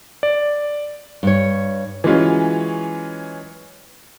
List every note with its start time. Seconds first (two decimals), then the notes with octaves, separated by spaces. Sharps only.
0.23 D5
1.23 G2 C#5
2.04 E3 F#3 G#3 C#4 F4